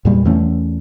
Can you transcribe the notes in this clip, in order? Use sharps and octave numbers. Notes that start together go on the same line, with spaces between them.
E2 A#2 G3
E2 E3 A3 C#4